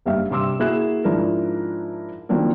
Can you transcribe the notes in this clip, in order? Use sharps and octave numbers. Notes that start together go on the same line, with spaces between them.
F#1 G2 E5 F5
G2 C3 C6 D6 E6 E7
A#3 E4 F#4 G#4 F#6 E7
G#2 F3 D4 E4 A#4
D#3 F3 F#3 A#3 C4 D4